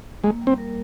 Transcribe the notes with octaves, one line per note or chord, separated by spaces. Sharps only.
G#3 A#3
G3
C4
A#4